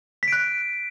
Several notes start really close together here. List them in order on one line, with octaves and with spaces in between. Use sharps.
B6 D7 F#6